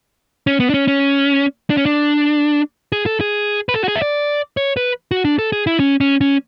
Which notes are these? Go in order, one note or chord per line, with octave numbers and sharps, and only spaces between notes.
C#4
B3
D4
C#4
C#4
D4
C#4
D4
G#4
A4
G#4
B4
A4
F#4
G#4
E5
D5
C#5
B4
F#4
D4
A4
G#4
E4
C#4
C#4
C#4